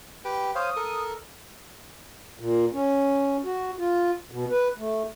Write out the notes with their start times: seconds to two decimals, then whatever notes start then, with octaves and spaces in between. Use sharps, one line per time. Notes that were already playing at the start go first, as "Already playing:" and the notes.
0.25 G4 B4 G5
0.55 C5 C#5 F5 D#6
0.76 A4 A#4
2.39 A#2
2.73 C#4
3.45 F#4
3.79 F4
4.32 B2
4.50 B4
4.78 A3